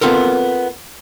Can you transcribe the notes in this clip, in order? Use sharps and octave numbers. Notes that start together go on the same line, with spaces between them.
B3 C4 F4 A4 A#4